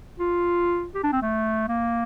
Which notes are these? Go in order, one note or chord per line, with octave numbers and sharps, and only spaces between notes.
F4
G4
D4
C4
A3
A#3